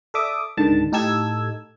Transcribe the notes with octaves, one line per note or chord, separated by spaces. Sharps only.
A4 D5 E5 D6 D#6
C#2 G#2 D3 D#3 A5
A2 D#4 G4 A4 E6 G#6